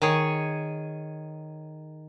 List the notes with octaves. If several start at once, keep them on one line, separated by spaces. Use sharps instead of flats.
D#3 G#4 C#5